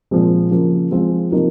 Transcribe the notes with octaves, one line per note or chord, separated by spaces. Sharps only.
A#2 F3 G#3 C4
C#3 F3 A#3
F3 G#3 C4 F4 G#4
C3 F3 A#3 D#4 A#4